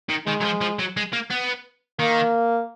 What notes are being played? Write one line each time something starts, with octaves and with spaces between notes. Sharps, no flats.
D#3
D#3 G#3
F#3
F3
F3
F#3
G#3
A#3
B3
D#3 A#3